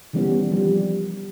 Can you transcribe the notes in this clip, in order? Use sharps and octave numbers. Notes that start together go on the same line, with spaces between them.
D#3 E3 G3 A#3 B3 C#4
D#3 F3 G3